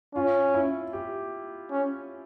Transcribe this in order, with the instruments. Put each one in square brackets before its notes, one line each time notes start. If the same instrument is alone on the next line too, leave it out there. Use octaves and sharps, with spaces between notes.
[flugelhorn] C#4 [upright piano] F4
[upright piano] E4
G4
[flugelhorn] C#4